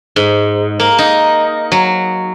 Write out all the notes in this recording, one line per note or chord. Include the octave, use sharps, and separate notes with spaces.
G#2
A#3
D#4
F#3